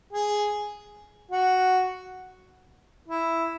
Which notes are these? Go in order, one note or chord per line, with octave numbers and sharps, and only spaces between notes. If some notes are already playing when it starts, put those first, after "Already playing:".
G#4
F#4
E4